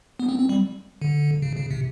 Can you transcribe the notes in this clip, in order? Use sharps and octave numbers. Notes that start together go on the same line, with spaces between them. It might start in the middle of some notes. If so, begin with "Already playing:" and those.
B3
C4
C4
G3
D3
C#3
C#3
C3